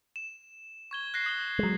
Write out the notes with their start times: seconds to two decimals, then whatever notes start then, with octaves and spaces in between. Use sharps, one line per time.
0.16 E7
0.91 C#6 G#6 G7
1.14 F#6 A#6 C7
1.26 D#6 G7
1.59 F#3 G#3